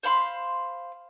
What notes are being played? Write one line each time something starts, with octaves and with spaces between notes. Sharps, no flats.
C5 F5 B5 C6